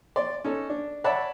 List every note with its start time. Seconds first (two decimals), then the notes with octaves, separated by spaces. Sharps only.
0.16 D5 C6
0.44 C#4 D#4 A4
0.70 D4
1.04 C#5 D5 E5 F#5 A5 B5